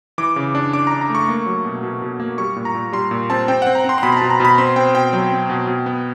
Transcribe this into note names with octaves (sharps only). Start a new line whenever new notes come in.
E3 D6
C#3
D4
D4 D6
D4 A#5
A#5
A3 C#6
A#3
F#3
B2
B2
B2
A#3
G3 C#6
A#2
A#5
A#2
G3 C6
A#2
C4 A5
C4 G5
F#5
C4
A#5
C4 C6
C6
B2 B5
A#5
B2 A5
A#5
B2 B5
C4 C6
C4 G5
B2 G5
F#3
C4
B2
B2
B3